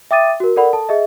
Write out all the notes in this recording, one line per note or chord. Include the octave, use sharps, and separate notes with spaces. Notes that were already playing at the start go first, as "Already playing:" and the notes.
E5 G5 D6 D#6 A6 D#7
F#4 A#4
A4 A#4 D5 F#5 B5
A4 A5
G#4 D#5 E5